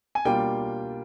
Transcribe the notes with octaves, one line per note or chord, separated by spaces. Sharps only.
G#5
B2 G3 A#3 D4 F4 G5